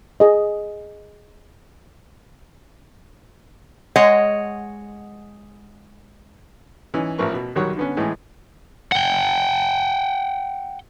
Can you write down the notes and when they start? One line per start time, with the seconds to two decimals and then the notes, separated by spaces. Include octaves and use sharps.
0.20 G#4 D#5
3.96 G#3 C#5 D#5 F#5
6.94 E3 C#4 D#4
7.19 A1 F3 A#4 B4 C#6
7.34 B2
7.56 B1 D#3 F#3 G3 C#5 F#5
7.77 D3 B3 C#4
7.97 A2 E3 G#3
8.92 F#5 G5